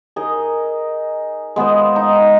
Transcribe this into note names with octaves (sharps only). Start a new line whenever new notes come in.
D#4 G#4 A#4 D#5
G#3 B3 F4 C5
D#4